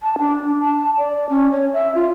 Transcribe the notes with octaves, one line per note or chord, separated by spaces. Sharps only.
A5
D4
A5
D5
C#4
C#5
E5
F4